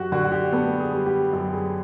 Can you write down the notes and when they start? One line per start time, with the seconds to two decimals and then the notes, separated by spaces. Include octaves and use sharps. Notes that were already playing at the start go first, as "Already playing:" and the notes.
Already playing: F#2 F#4 G4
0.12 D3 F#4
0.24 F#4
0.32 G4
0.52 B3 A4
0.80 G#4
0.93 G3
1.06 G4
1.33 F#2 G4
1.53 G#4